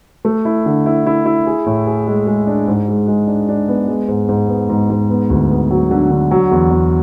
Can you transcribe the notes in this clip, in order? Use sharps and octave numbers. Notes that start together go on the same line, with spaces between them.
A3
E4
D3
E4
E4
E4
G#4
A2
G#4
G#3
G#3
D4
G#2
G#3
G#3
D4
D4
B3
G#3
G#2
G#2
B3
G#2
G#2
B3
D2
B3
F#3
D3
D3
F#3
E2
E2